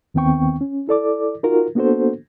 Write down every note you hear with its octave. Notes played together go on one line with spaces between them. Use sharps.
D#2 D#3 B3 C4 G5 C#6
C#4
E4 A4 D5 D6
D#4 F4 F#4 A#4
A#3 B3 D4 F#4 A4 C5